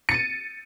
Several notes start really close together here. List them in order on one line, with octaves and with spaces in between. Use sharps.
C#7 A6 D#7